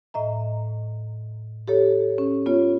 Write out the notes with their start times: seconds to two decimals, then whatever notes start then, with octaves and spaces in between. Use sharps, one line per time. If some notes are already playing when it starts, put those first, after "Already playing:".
0.14 A2 D#5 E5 A#5
1.68 G4 A4 C#5
2.18 C#4
2.46 B3 F4 C#5